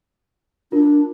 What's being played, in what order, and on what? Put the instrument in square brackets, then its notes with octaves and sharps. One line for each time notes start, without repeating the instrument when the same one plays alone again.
[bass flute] D4 [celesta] F4 A#4